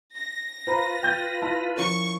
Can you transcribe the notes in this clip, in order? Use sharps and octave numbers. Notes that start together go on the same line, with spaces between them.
A#6
F4 B4 C5 A#5 B5
G5 G6 A6
E4 A5
F3 C#4 A#4 C#6